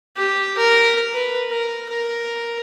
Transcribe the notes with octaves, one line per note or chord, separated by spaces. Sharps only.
G4
A#4
B4
A#4
A#4